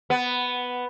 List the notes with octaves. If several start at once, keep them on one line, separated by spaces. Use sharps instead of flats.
B3